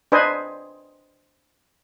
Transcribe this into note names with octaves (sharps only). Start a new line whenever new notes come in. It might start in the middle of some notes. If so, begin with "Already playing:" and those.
D4 B4 C5 D#5 G#5